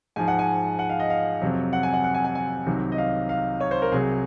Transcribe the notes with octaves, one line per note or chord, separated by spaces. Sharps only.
G#2 F3 G#5
F#5
G#5
F#5
F5
D#5
F5
F2 C3 F#3
F#5
G#5
F#5
F#5
G#5
G#5
G#5
C2 C3 D#3 F#3
D#5
F5
F5
C#5
C5
A#4
C2 C3 F#3 G#4